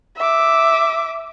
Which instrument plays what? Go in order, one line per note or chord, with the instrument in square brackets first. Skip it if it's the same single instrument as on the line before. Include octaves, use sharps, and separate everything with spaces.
[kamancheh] E5 D6